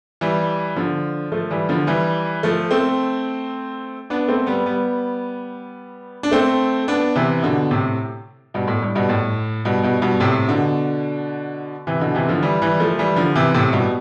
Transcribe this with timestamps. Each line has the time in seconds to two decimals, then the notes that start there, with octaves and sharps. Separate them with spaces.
0.21 E3 G3
0.76 D3 F3
1.32 F3 A3
1.51 E3 G3
1.69 D3 F3
1.87 E3 G3
2.43 F3 A3
2.71 A3 C4
4.10 B3 D4
4.28 A3 C4
4.47 G3 B3
4.66 G3 B3
6.23 D4
6.31 A3 C4
6.88 B3 D4
7.16 C3 E3
7.43 B2 D3
7.71 A2 C3
8.54 G2 B2
8.67 A2
8.82 G2
8.95 G2 B2
9.09 A2
9.65 G2 B2
9.83 G2 B2
10.02 G2 B2
10.20 A2 C3
10.48 B2 D3
11.87 C3 E3
12.01 B2 D3
12.15 C3 E3
12.28 D3 F3
12.42 E3 G3
12.62 E3 G3
12.80 F3 A3
12.99 E3 G3
13.16 D3 F3
13.35 C3 E3
13.54 A2 C3
13.73 G2 B2